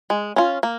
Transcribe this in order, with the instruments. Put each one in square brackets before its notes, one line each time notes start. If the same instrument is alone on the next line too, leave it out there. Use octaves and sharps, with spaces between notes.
[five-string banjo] G#3
C#4 F4
A#3